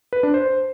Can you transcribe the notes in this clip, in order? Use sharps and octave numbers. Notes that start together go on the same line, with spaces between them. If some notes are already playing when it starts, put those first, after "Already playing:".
B4
D4
C5